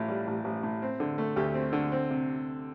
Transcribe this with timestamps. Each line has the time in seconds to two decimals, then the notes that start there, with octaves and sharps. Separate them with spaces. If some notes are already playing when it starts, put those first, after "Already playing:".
Already playing: A1 A2 F4
0.08 G3
0.27 A1
0.44 A1
0.63 A2
0.82 C4
1.00 D3
1.18 A3
1.36 D2 G4
1.54 C4
1.73 D3
1.92 C4
2.10 C3